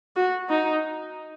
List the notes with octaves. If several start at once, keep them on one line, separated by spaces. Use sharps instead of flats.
F#4
D#4